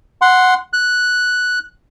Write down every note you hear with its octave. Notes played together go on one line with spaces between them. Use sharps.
F#5 C6
F#6